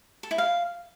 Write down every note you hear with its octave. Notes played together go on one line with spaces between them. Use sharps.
A4
E4
F5